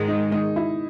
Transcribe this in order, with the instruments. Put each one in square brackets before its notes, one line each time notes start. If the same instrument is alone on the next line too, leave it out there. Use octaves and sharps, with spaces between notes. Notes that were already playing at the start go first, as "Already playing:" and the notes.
Already playing: [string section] G#2 D#3 G#3
[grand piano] D#4
D#4
E4